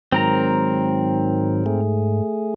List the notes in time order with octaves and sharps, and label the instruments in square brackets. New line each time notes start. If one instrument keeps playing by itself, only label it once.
[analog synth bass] G#2 [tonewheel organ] D#3 F#3 [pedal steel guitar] C4 A#4 A#5
[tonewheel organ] A3 G#4